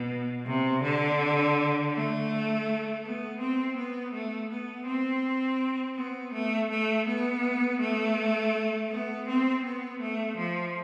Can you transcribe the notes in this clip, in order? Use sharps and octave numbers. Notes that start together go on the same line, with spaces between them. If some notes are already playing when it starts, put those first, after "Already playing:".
Already playing: B2
C3
D3
A3
B3
C4
B3
A3
B3
C4
B3
A3
A3
B3
A3
B3
C4
B3
A3
F3